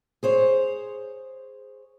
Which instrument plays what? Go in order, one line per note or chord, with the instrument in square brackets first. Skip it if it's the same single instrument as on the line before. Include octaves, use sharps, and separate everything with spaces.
[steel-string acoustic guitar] G#4 C5 C#5